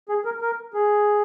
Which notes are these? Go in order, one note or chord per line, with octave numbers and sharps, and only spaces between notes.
G#4
A#4
A#4
G#4